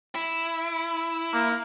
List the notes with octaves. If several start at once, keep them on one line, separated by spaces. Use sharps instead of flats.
E4
A#3